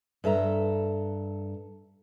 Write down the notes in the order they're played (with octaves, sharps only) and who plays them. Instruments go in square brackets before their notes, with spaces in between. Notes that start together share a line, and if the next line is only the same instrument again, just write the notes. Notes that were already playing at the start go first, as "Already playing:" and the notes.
[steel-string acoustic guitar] G2 A4 E5 A#5